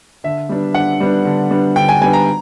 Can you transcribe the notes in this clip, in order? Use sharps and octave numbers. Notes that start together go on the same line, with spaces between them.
D3 E5
G3 B3 D4
D3 F#5
G3 B3 D4
D3
G3 B3 D4
D3 G5
G#5
G3 B3 D4 G#5
A#5